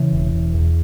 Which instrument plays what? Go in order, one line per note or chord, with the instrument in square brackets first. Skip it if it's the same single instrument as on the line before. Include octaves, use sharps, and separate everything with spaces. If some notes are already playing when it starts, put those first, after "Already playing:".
Already playing: [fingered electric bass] C#3 E3
E1
E1
E2